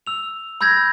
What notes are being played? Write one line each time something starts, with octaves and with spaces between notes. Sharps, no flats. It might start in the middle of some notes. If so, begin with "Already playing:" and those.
E6 F7
B5 E6 G6 G#6 A#6